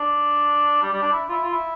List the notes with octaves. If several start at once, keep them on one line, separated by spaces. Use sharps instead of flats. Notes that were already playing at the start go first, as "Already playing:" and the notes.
Already playing: D4
G3
G3
D4
E4
F4
E4
F4
E4